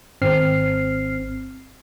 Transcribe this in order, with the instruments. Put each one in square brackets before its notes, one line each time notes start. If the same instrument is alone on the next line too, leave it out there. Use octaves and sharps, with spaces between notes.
[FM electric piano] G#1 C4 F6 C7